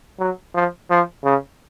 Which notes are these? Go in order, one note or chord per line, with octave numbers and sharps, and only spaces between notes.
F#3
F3
F3
C#3